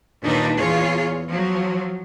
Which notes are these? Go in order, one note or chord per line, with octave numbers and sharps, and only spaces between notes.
D#2 A#2 D4 D#4 B4
E2 F4 G#4 C#5
F3 F#3